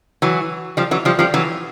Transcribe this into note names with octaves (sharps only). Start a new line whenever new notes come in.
E3 F#3
F3 G3
E3 F#3
F3 G3
F3 G3
E3 F#3